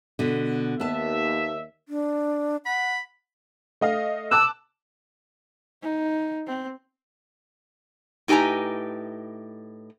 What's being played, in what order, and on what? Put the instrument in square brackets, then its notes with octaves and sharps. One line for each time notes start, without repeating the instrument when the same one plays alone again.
[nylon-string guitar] B2 D3
[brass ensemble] D#2 E5 [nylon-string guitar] B3 A5
[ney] D4
[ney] F#5 [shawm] B5
[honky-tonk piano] A3 D#5 F5
[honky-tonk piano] A5 D6 F#6 [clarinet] E6
[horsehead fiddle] D#4
C4
[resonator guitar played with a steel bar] A2 D#4 G4 B4 G#5 A#5